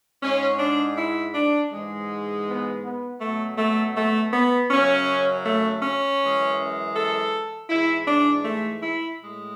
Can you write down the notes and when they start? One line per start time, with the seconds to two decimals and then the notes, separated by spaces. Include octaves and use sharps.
0.23 G#2 G#3 C#4
0.59 D4
0.98 E4
1.35 D4
1.72 G#2 E3 G#3
2.47 B3
2.84 B3
3.21 B2 F#3 A3
3.58 A3
3.97 A3
4.33 B3
4.71 F#2 C#3 F#3 C#4
5.45 A3
5.83 C#4
6.21 F#2 E3 G#3
6.95 A4
7.69 G#2 E3 G#3 E4
8.08 D4
8.45 A3
8.82 E4
9.20 A2 G#3